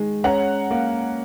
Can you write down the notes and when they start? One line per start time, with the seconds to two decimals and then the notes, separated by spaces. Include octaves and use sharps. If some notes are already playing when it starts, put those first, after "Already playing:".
Already playing: D#3 G#3
0.24 C#4 F#5 A#5
0.71 A#3